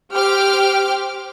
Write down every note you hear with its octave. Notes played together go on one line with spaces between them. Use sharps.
G4 C5 G5 D6 F6